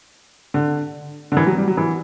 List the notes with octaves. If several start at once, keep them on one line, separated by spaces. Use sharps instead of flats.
D3
D3
E3
F#3
G3
F#3
E3